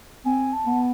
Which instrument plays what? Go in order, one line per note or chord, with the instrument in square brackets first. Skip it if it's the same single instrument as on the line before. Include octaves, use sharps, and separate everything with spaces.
[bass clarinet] C4 [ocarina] G#5
[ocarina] A5
[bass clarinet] B3